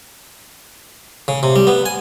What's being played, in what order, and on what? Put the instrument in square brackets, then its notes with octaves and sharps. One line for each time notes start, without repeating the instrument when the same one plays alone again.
[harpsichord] C#3
C3
G3
B3
G#5